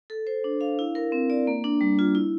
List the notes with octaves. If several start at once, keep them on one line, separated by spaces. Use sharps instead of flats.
A4
C5
D4
F5
E4
A#4
C4
D5
A#3
D4
G3
F4
E4